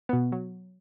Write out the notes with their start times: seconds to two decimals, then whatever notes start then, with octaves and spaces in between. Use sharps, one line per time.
0.09 B2 B3
0.32 F#3